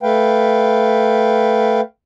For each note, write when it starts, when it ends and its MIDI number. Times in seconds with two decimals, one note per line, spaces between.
0.03 1.81 57
0.03 1.81 71
0.03 1.81 77
0.03 1.81 79